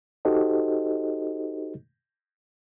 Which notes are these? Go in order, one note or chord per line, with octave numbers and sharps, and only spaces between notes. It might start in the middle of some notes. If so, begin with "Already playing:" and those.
D#4 F#4 G4 A4 C5 D#5